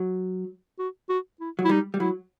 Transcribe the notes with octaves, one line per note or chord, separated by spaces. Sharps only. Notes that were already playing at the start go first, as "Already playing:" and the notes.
Already playing: F#3
F#4
F#4
E4
F#3
E4
G3 D#4
G3
F#3 E4